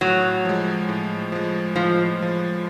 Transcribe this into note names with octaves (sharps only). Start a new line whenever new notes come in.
A2 F#3
F3 G#3
A2
F3 G#3
A2 F3
F3 G#3